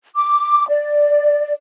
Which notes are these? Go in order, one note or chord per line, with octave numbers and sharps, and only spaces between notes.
D6
D5